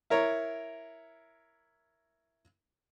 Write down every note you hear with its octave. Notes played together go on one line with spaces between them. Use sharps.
E4 A#4 C#5